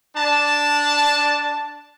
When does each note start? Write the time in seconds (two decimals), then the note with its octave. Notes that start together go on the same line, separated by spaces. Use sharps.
0.16 D4 A5